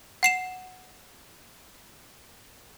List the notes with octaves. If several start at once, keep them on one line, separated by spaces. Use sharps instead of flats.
F#5 C7 E7